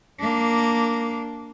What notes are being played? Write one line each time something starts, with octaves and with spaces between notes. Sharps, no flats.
A#3 D4